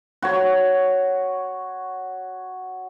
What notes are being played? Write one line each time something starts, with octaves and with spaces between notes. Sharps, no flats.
F#4 C#5